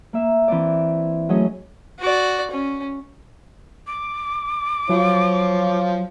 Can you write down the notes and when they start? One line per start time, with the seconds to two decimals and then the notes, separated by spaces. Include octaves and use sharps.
0.13 A#3 E5
0.48 E3 C4 D5
1.29 F#3 A3 C#4 G#4 C#5 D#5
2.00 F#4 D5
2.51 C#4
3.87 D6
4.89 F3 F#3 F4 C#5